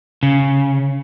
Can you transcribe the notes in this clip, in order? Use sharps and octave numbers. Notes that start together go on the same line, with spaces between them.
C#3